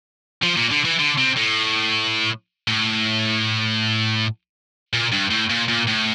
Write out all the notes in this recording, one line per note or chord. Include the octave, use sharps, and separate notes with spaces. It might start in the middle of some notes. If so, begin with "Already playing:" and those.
F3
A#2
D3
E3
D3
C3
A2
A2
A#2
G2
A2
A#2
A#2
A2